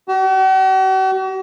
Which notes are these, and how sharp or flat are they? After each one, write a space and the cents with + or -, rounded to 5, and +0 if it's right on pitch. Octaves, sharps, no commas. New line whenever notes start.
F#4 +45